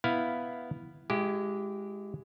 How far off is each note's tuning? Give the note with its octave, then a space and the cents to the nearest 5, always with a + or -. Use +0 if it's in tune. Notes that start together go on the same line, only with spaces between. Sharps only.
B3 +0 E4 +0 F5 -5
G#3 +0 E4 +40 G4 -15